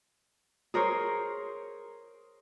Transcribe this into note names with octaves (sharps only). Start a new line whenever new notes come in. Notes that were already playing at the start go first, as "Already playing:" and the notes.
G#4 A#4 C5 C#5